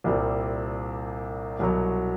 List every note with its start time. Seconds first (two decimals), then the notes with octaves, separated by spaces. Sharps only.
0.04 C2 A#2 G3 C4
1.59 C2 B2 F#3